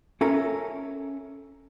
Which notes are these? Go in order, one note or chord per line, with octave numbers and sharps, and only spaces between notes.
C#4 A4 A#4 E5 A#5